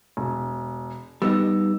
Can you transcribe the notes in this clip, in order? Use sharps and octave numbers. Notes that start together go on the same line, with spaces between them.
E1
G3 B3 D#4 E6